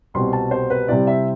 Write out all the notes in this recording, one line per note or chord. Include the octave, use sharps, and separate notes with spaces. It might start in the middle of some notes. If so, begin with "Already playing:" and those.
C2 B2 G3 C4 C6
A5
C5
B4
C3 G3 C4 E4 D5
E5